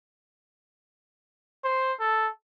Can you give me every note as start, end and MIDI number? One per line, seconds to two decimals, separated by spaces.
1.64 1.93 72
2.00 2.28 69